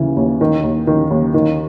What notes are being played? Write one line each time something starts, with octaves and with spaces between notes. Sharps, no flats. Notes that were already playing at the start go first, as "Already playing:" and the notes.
Already playing: D#2 C#3 E3
D#2
D#3
D#2
D#3
D#2
D#3